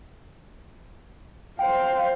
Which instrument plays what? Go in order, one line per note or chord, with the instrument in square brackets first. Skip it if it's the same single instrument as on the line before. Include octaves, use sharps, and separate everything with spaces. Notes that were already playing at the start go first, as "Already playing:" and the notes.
[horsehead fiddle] C5 F5 [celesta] G5